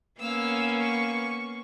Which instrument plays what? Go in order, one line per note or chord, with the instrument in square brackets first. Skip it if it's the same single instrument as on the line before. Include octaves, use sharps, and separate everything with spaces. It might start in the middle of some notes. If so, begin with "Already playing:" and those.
[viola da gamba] A#3 B3 C#4 [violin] F5 E6
[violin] C#6